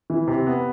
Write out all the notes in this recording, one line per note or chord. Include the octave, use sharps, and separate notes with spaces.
E3
C3
B3